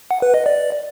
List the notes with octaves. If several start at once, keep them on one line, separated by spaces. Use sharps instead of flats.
F#5
B4
D#5
D5